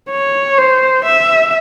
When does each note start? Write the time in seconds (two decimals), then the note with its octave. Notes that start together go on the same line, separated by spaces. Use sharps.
0.11 C#5
0.58 C5
1.05 E5